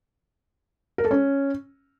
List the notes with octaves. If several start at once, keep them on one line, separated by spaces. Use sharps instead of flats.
A#4
A4
C#4